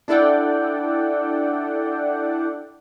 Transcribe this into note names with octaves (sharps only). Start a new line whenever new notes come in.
D4 E4 A4 D5 F#5 G5